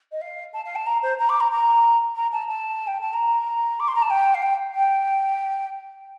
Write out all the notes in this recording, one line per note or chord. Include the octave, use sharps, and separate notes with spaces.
D#5
F5
A5
F5
A5
A#5
C5
A#5
D6
A#5
A#5
A#5
A5
A5
G5
A5
A#5
D6
C6
A#5
A5
G5
F5
G5
G5